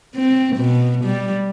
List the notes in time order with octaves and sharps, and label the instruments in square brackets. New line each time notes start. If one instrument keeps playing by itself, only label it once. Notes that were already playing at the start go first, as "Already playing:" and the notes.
[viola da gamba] C4
B2
G3